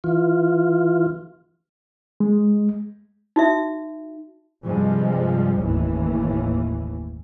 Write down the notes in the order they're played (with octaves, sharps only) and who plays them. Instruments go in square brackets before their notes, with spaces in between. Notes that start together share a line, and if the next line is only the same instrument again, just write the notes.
[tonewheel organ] E3 F4
[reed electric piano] G#3
[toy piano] D#4 F#4 E5
[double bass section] G2 C3 F3 G3 G#3
F#1 D#2 A2 E3